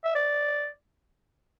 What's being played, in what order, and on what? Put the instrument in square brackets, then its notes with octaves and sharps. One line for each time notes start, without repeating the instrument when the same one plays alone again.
[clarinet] E5
D5